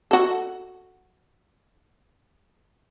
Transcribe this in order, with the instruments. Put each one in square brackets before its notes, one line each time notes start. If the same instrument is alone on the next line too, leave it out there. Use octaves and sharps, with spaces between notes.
[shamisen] F#4 A4